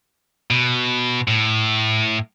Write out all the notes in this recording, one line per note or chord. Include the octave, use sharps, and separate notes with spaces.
B2
A2